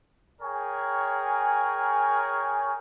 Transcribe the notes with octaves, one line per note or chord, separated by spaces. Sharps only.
G#4 A#4 C#5 G5 G#5 C#6